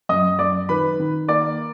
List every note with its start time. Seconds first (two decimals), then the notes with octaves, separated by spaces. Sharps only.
0.09 F#2 D#5 D#6
0.39 F#2 D5 D6
0.69 D#3 B4 B5
1.00 D#3
1.28 A#3 D5 D6